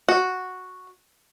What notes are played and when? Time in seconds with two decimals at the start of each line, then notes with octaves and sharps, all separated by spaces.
0.09 F#4